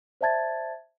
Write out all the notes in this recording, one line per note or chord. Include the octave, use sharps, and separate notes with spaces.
C5 D5 E5 A5 G#6 A6